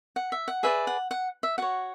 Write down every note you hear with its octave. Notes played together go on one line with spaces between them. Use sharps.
F#5
E5
F#5
G#4 B4 D5 E5
F#5
F#5
E5
F#4 C#5 F#5